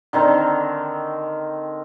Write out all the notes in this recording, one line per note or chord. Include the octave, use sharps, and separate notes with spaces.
D3 D#3 C4 A#4